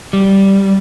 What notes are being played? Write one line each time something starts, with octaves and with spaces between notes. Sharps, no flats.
G3